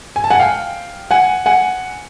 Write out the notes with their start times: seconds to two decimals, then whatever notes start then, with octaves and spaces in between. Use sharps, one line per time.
0.16 G#5
0.24 A5
0.30 F#5 G#5
0.39 F5 G5
1.11 F#5 G#5
1.46 F#5 G#5